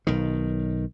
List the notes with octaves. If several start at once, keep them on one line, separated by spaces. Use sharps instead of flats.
B1 D#3